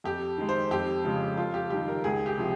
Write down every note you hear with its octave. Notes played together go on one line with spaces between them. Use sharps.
F2 G4
D#3 G#3
C5
F2 G4
C#3 F3 G#3
F2 F4
G4
D#3 G3 G4
A#4
C#2 G#4
G4
C3 F3